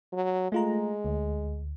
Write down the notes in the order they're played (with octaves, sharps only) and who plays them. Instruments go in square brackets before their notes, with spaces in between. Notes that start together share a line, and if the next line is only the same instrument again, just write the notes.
[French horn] F#3
[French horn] G#3 [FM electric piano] A3 F4 A#5
[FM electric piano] D2